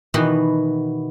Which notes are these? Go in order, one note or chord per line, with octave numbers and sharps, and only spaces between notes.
B2 D#3 E3 B3 F#4